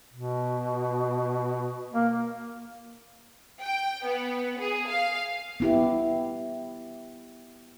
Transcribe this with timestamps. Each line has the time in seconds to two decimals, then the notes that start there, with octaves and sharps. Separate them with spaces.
0.14 B2
1.94 A#3
3.61 G5
4.05 B3
4.59 G#4
4.89 F5
5.60 B3 E4 G4